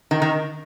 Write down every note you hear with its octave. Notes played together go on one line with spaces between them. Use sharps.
D#3
D#3